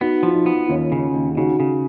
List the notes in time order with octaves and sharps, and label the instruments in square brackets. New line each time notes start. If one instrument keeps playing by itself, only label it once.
[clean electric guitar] B3 [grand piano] D#4 F#4
[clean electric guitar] F3 [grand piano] F4
[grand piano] D#4
[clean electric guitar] B3
[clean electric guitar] D#2 [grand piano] C#4 F4
[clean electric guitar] C#3
D#2
[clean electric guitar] C#3 [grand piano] D#4 F#4
[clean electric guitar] C#3